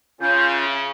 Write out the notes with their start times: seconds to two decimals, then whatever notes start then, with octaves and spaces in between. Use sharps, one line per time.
0.21 C#3 C#4 F4 G6
0.55 E5